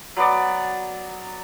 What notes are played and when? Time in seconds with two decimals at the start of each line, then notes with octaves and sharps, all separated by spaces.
0.16 F#3 B3 D5